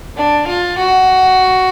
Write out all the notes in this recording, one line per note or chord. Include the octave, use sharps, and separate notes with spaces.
D4
F4
F#4